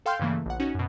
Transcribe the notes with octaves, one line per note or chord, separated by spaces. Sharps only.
A4 F5 G5 C6 F6 G6
G2 C#3 E3 A3 A#3
A#1 F#5
C#4 D#4 F#4
F#2 B2